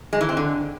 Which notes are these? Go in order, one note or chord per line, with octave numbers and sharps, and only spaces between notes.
G#3
E3
C4
D3